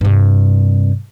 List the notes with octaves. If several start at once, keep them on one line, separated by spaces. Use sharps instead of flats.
G2 C3